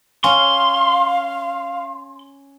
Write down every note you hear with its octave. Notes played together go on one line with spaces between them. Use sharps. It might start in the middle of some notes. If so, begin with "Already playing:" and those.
C#4 F5 C6